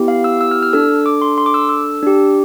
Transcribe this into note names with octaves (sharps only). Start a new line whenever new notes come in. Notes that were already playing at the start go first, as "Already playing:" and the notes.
Already playing: B3 E4 G4
F5
E6
E6
F6
F6
D4 A4 E6
D6
C6
C6
D6
E6
E6
D4 G4